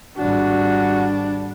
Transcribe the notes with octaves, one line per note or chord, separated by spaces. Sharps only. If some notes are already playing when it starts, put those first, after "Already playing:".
G#1 G3 D4 F#4